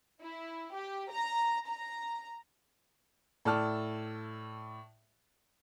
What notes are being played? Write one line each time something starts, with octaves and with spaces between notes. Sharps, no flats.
E4
G4
A#5
A#5
A2 A4 D5 A5 F6